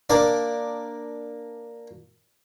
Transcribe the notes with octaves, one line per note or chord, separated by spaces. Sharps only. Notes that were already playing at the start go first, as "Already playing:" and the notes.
A#3 D4 D5